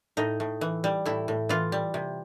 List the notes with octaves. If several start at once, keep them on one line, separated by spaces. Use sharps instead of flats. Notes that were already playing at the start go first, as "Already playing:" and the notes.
A2 D#4
A2
E3
G3
A2 E4
A2
E3 F4
G3
C3